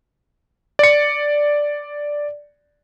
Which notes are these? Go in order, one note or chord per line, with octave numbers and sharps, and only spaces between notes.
D5 C#7